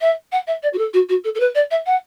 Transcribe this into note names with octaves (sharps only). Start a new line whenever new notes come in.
E5
F#5
E5
D5
F#4
A4
F#4
F#4
A4
A4
B4
D5
E5
F#5